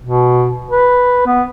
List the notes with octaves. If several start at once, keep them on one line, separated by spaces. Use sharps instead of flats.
B2
B4
B3